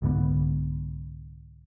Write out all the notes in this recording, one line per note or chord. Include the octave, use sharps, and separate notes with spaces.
C2 G#2 D3 B3